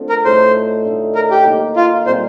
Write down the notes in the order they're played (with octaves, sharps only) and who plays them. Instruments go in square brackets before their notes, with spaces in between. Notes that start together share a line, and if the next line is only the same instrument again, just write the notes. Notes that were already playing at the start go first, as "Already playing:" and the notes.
Already playing: [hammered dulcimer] D3 F3 A3 C4 D4
[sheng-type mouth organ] A#4
[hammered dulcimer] A2 F3 A3 D#4 [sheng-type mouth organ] C5
[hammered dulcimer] D3 A3 D#4
[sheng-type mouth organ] A#4
G4
[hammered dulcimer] D#3 A#3 D#4
[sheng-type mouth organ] F4
[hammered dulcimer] A#2 G3 C4 G4 [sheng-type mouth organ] C5